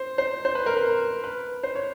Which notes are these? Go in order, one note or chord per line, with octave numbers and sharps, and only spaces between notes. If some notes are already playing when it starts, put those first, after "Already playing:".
Already playing: C5
C5
C5
B4
A#4
B4
B4
C5
C#5